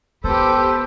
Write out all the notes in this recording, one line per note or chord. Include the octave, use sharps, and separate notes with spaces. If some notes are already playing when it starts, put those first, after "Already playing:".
B3 G4 A4 B4 C5